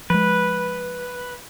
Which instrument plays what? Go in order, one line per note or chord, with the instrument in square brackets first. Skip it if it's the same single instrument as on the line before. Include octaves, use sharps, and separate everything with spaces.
[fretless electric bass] F3 G#3 [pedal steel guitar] B4